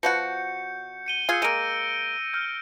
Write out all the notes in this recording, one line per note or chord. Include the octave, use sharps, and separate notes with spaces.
B2 F3 F#4 G6 C#7
C#7 D#7 G7
F4 G#4 E6 G6 C#7
G#3 A#3 A#6 D7 D#7
F6 G6